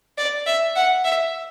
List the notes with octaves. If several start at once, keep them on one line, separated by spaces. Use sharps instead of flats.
D5
E5
F#5
E5